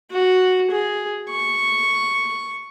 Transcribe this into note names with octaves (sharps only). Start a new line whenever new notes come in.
F#4
G#4
C#6